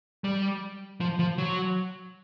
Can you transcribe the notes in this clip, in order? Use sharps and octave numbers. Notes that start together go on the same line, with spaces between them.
G3
F3
F3
F#3